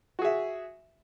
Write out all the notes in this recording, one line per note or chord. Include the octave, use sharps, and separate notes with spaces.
F#4 G#4 E5